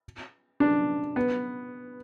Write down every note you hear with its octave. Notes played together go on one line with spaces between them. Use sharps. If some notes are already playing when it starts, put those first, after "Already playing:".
D4
B3